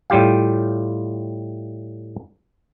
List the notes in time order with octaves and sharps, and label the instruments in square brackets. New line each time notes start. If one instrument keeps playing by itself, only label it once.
[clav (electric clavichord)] A2 G3 F4 G4 F5